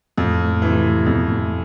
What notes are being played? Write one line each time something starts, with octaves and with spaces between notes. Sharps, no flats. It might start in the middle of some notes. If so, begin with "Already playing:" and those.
F2 A2
C3 E3
F2 B2
A2